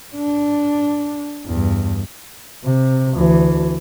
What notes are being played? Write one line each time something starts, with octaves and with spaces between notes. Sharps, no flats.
D4
E2 G2
C3
D2 E3